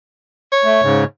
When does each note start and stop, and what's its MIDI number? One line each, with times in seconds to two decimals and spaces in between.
0.52 1.02 73
0.64 0.81 57
0.82 1.04 44
0.82 1.04 49